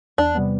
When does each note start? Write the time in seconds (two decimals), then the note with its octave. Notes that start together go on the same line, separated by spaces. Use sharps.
0.18 E2 D4
0.34 C3 G3 B3